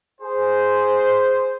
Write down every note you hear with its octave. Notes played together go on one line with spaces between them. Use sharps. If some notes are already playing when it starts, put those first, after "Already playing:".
G#4 C5